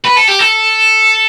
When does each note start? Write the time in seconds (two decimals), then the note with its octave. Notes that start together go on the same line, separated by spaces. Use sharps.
0.04 B4
0.16 A4
0.28 G4
0.39 A4